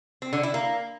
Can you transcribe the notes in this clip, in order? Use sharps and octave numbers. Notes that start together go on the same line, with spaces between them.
C4
D3
E4
A#3